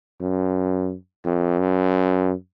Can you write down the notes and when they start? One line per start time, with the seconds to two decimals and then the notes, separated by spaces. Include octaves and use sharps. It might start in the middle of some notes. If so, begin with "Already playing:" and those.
0.21 F#2
1.25 F2
1.60 F#2